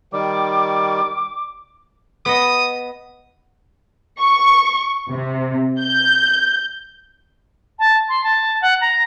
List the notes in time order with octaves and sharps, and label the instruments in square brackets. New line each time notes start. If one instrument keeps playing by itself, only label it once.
[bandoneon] D#3 G3 [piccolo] D6
[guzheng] B3 D#5 [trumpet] D#6
[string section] C#6
C3
G6
[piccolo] A5
C6
A5
F#5
A#5